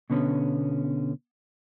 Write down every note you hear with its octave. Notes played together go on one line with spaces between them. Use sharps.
B2 D3 B3 C#4